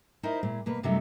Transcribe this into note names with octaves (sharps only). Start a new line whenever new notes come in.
D#4 E4 A#4 C5 D#5
A#2 G#3 E4
B2 A#3 B4
F#2 C3 F#3 G3 A3 D#4